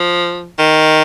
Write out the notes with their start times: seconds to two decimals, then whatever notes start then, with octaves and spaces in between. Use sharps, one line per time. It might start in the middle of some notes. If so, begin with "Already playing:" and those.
Already playing: F3
0.59 D#3